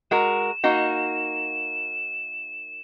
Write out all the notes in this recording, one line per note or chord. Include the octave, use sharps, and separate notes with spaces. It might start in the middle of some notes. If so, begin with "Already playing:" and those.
G#3 F#4 A#4 E7
A#3 D#4 F#4